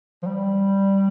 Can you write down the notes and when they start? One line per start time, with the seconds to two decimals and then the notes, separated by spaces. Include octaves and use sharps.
0.23 F3
0.26 G3